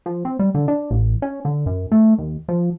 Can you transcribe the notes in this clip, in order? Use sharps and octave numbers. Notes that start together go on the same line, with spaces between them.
F3
C4
G3
D3
D4
A1
C#4
D3
F#2
A3
D#2
F3